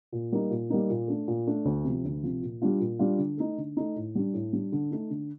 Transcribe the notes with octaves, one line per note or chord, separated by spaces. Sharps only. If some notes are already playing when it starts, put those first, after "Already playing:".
A#2
G3 A#3 D#4
A#2
G3 A#3 D#4
A#2
A3 D4
A#2
A3 D4
D2
C3
F3
D2
C3 F3
A#2
G3 D4 F4
A#2
G3 D4 F4
D3
A3 D#4
D3
A3 D#4
A2
G3 D4
A2
G3 D4
D3
A3 D#4
D3